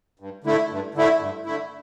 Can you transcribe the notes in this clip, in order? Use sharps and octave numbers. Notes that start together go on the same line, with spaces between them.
G2
D3 A3 E4
G2
D3 A3 E4
G2
D3 A3 E4